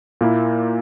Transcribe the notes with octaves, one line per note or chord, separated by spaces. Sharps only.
A#2 A#3 E4